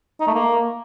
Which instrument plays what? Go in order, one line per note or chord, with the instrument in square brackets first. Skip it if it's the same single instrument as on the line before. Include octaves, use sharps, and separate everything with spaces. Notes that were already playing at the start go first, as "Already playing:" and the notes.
[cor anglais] D#4
A3
A#3